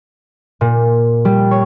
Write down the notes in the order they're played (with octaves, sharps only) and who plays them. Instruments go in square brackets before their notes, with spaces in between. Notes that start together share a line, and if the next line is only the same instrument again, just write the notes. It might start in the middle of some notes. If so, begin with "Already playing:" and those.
[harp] A#2
G3
C#5